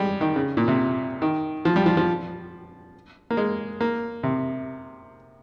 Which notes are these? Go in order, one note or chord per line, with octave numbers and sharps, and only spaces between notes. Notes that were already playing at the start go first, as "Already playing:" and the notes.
Already playing: G3 G#3
D#3
C#3
A#2
C3
D#3
F3
G3
F3
F3
A#3
G#3
A#3
C3